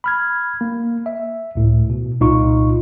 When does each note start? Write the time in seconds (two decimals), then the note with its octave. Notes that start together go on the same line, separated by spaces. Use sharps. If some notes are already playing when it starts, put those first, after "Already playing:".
0.04 B5 F6 G#6
0.61 A#3
1.06 E5
1.55 C#2 A2
1.90 B2
2.20 C2 A#2 D#4 F4 C#6